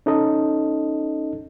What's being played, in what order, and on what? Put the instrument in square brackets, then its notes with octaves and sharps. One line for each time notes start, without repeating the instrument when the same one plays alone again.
[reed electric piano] C#4 D#4 A4 D#5